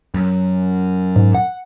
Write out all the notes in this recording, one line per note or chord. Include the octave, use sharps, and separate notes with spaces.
F#2
G#2
F#5